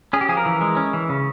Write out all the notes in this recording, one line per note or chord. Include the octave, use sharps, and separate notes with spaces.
C#4 G#4
G4
F3 G#4
A#4
E3
G#3
C#4
E3
C#3